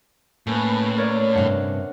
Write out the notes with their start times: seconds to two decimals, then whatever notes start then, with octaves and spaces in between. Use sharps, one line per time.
0.47 A2 A#3 C#4 B4
0.97 A#4 C#5 D5
1.35 G2 C3 F#5